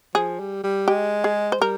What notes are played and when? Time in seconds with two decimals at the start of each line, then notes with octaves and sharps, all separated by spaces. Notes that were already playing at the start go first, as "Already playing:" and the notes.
0.15 F3 G#4
0.39 G3
0.63 G3
0.88 G#3 G4
1.24 G#4
1.52 C5
1.61 G3 A#4